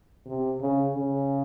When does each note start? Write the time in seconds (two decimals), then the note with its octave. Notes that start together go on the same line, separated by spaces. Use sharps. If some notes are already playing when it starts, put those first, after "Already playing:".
0.26 C3
0.61 C#3
0.95 C#3